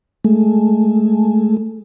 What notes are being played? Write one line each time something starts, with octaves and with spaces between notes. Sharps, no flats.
G#3 A3